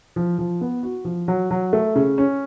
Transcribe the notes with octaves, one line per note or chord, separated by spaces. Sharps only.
F3
F3
B3
F#4
F3
F#3
F#3
A3
C#3
C#4